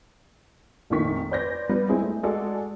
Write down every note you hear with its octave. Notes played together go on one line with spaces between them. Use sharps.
F1 A#1 F2 D#3 C#6 B6
B4 C5 D5 G6 G#6 A#6
F3 G3 B3 B4 D5
G#3 C4 E4 G#4
A3
G#3 F#4 A4 D5